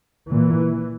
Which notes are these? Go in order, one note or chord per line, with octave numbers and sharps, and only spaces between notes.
A#2 E3